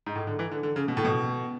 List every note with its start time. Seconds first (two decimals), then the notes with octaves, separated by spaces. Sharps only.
0.06 G#2
0.15 A2
0.27 D3
0.39 E3
0.51 D3
0.63 D3
0.76 C#3
0.88 B2
0.97 A2
1.05 B2